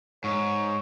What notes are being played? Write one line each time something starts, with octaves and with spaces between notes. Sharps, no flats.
G#2 C#5